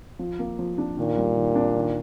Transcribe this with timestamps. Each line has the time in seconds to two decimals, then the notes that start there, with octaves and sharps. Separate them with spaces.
0.19 F3
0.39 A#3
0.59 F3
0.78 D4
0.97 A#2 D#3
1.17 G3
1.36 D#3
1.56 D4
1.75 D#3